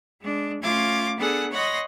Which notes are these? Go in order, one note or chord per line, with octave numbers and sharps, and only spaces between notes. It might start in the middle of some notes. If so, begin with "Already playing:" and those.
G#3 D4
A3 C#4 F4 D6 G#6
B3 D4 G#4 A4 F#5 G#5
C#5 D#5 F#5 B5 C6 A#6